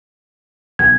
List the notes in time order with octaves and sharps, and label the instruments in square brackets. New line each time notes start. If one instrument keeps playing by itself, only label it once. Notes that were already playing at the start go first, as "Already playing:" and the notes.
[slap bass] B1 [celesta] G#6